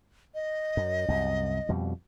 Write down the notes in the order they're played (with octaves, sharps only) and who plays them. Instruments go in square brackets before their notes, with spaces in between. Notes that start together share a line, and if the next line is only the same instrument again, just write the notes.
[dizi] D#5
[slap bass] F#2
C2 F#2
F2 B2 G3